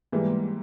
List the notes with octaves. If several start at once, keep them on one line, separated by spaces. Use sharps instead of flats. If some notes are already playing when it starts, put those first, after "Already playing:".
G#2 E3 G3 A#3